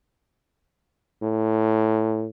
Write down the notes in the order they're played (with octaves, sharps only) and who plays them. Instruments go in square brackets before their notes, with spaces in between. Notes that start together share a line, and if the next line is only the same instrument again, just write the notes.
[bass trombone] A2